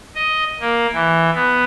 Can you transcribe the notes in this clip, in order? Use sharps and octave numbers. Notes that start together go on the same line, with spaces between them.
D#5
A#3
E3
B3